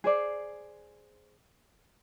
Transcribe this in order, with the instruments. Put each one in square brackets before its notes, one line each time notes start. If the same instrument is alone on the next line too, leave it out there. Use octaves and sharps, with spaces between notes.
[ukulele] G#4 C5 D5